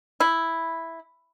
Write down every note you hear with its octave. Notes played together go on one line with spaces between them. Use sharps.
E4